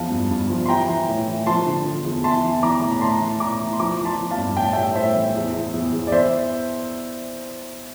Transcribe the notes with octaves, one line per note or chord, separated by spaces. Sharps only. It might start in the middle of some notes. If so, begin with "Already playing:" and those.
Already playing: E2 F3 F5 A5
G2
G2
F3
C6
E3 G5 A#5
E3
A2
E3
F3 A5 C6
D3
F3
E2
E3 A5 C6
E3
E3 A#5 D6
A2
A#5
A2 A5 C6
E3
A2 A#5 D6
E3
C6
F3 A#5 D6
F3
A5 C6
F3
F5 A5
G2
A2 G5
A5
A2 E5 G5
A2 C5 E5
E3
E2
E2
E2
E2
D5
E3 C5 E5